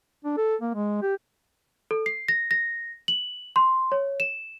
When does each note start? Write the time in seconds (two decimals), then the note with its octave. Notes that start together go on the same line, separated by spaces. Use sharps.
0.25 D4
0.38 A4
0.62 A#3
0.74 G#3
1.02 G4
1.91 A4
2.06 C7
2.28 A#6
2.51 A#6
3.08 F#7
3.56 C6
3.92 C#5
4.20 E7